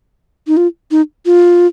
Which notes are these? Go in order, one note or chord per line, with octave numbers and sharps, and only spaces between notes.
D#4
F4
D#4
F4